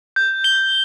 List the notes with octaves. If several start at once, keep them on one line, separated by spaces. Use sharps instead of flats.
G6
G7